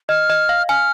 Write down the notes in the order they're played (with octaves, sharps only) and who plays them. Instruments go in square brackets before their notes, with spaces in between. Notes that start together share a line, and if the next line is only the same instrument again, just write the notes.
[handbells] D#5 [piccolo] F6
[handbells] D#5
F5
[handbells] G#5 [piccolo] F6